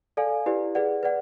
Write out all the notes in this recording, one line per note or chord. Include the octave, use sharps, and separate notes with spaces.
A4 D5 F5 G#5
E4 G4 B4 D5
G#4 B4 D5 F#5
B4 D5 F#5